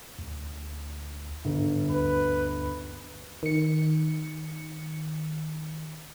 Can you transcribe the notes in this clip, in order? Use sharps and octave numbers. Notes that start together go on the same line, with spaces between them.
D2
G1 G#2
D2 B4
D#3 C#7